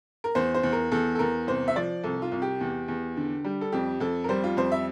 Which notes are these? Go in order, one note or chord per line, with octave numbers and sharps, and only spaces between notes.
A#4
E2 C5
C5
E2
A#4
E2 A4
A4
E2 A#4
C2 C5
E5
F3 D5
C2 A4
F4
C2
G4
E2
E2
D3
G3
A4
F2 G4
F2 A4
A#4
G3 C5
F4
F2 C5
E5